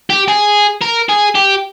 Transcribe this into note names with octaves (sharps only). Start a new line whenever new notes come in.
G4
G#4
A#4
G#4
G4